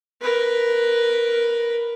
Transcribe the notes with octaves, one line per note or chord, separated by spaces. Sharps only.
A#4 B4